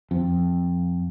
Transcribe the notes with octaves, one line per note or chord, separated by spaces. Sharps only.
F2